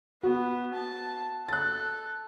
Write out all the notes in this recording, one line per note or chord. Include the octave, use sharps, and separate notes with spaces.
B3 F#4
A5
A4 F#6 A6